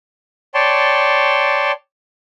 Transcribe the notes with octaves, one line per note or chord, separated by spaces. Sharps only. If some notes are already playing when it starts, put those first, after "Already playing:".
C#5 D5 G5 A5 C6